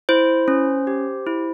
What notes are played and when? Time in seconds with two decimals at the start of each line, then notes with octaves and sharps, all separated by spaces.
0.09 E4 C5
0.48 C#4
0.87 G4
1.27 E4